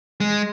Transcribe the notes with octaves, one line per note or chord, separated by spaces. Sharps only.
G#3